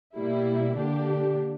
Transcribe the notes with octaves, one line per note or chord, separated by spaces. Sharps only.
B2 G3 A#3 E4
D3 A#3 D4 G4